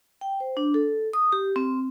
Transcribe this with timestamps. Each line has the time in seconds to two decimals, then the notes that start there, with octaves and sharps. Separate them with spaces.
0.21 G5
0.40 C5
0.57 D4
0.74 A4
1.13 D#6
1.32 G4
1.56 C4